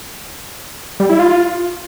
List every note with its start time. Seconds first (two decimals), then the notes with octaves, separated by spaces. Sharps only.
1.00 G3
1.09 E4
1.19 F4